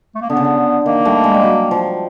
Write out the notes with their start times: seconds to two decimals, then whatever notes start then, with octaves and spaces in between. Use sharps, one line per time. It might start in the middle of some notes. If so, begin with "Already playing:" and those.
0.15 A3
0.21 A#3
0.30 D3 B3
0.37 C#3
0.44 D3
0.85 D#3 A#3
1.05 G3 A3
1.24 G#3
1.34 G3
1.43 F#3
1.71 F3